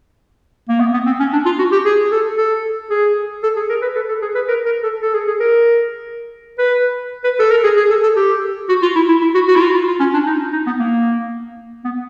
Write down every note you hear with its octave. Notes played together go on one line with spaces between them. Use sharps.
A#3
B3
B3
C4
C#4
D4
F4
F#4
G4
G#4
A4
A4
G#4
A4
G#4
A#4
B4
A4
A4
G#4
B4
A#4
A#4
A4
A4
G#4
G#4
A#4
B4
B4
A4
A#4
G#4
G#4
A4
A4
G4
F#4
F4
E4
E4
E4
F#4
F#4
E4
F4
F4
F4
C#4
D4
D#4
D#4
B3
A#3
B3